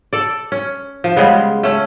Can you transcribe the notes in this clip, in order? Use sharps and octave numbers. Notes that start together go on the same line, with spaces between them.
A4 D5
C#4
F3
C#3 G3 G#3 B3
A3 C#4